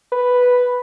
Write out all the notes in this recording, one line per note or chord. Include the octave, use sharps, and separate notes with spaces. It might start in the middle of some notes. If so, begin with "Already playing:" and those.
B4